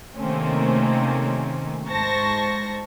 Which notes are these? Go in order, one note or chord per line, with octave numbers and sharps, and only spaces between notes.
C3 D#3 A3 A#3 C4 C#4
G#2 C5 A5 C#6 A#6